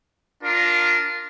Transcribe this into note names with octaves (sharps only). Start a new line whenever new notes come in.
D4 F4 A#4